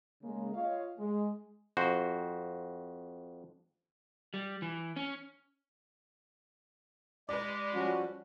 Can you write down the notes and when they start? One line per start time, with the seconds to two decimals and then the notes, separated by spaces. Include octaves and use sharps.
0.23 C#3 G#3 A#3
0.54 F4 C#5 D#5 F5
0.98 G#3
1.77 F2 F#4 C5
4.34 G3
4.62 E3
4.96 C#4
7.29 G#3 G4 B4 D5
7.74 F3 G3 C#4 F#4